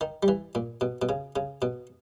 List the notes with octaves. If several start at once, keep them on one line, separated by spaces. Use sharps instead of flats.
D#3
G3
E3
A#2
B2
B2
C#3
C#3
B2